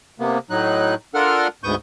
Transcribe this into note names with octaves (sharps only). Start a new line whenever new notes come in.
C3 A#3 B3
A2 F#3 D#4 F#6
D4 F4 A4 A#4 F#5 F6
D2 G#2 B3 C#6 D#6 G6